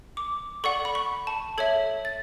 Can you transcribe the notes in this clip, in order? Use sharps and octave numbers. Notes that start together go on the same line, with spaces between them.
D6
A4 D5 F#5 C#6
B5
C#6
A5
A4 C#5 E5 G#6
A6